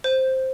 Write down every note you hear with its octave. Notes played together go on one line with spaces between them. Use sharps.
C5